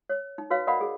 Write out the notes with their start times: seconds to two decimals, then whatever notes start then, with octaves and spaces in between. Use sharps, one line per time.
0.09 C#5
0.38 D#4
0.50 F#4 B4 C#5 F5
0.67 A#4 D5 D#5 F5 F#5 B5
0.81 G#4